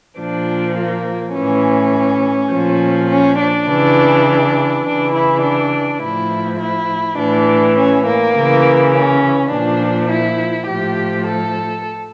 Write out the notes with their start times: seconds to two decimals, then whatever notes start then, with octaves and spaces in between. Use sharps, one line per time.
0.19 A#2 F3 D4
0.78 A#3
1.36 A2 E3 C#4
2.53 A#2 F3
3.10 C#4
3.40 D4
3.68 C#3 E3
4.85 C#3 E3 D4
5.14 E4
5.43 D4
6.02 A2 F3 E4
6.60 E4
7.18 A2 E3 D4
7.77 C#4
8.06 A#3
8.35 C#3 E3
8.92 C#4
9.51 A#2 F3 D4
10.10 E4
10.67 A2 F3 G4
11.26 A4